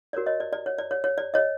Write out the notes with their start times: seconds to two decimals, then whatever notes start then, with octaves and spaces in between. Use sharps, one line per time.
0.13 F#4 A#4 C#5 D5
0.26 C#5 D#5
0.40 D5
0.53 D5
0.66 C#5
0.78 D5
0.91 C#5
1.04 C#5
1.18 D5
1.34 C#5 D#5